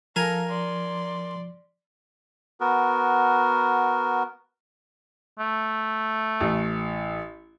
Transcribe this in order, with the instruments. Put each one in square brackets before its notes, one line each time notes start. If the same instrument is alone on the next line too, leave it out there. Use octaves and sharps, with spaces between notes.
[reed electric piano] F3 [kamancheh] A4 F5 [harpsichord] A#4 G#5 A#5
[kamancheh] D5 C6
[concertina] B3 F#4 A#4
[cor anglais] A3
[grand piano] A1